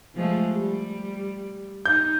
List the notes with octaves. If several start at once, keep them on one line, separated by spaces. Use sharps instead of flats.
F3 G#3 A3
G3
D#4 G6